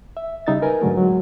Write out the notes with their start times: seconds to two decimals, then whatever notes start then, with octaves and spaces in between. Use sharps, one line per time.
0.17 E5
0.47 C#3 G3 D#4 E5 A6
0.62 A#4 B4 G#5
0.82 G#2 D3 F#3 A3
0.98 F#3 G#3